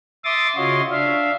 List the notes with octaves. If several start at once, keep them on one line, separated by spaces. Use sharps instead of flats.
E5 C6 D6 D#6 A6
C#3 F4 F#4 C#5 D#5 C6
D4 E5 F5